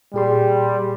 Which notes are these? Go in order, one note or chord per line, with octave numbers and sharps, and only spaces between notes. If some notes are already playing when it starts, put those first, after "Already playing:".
A#2 G3 G#4 C6